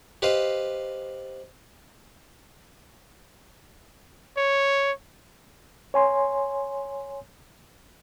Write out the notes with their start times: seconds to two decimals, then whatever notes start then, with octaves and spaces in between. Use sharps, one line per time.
0.22 G4 B4 C5 D#5 F5
4.37 C#5
5.94 C#5 G#5 C6